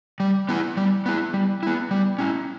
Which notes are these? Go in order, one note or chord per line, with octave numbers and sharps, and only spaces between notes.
G3
B3 E4
G3
B3 E4
G3
B3 E4
G3
C#4 E4